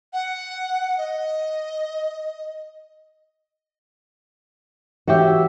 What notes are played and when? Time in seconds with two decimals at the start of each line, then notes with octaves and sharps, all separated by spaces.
0.13 F#5
0.98 D#5
5.08 E3 F#4 G4 C#5 E5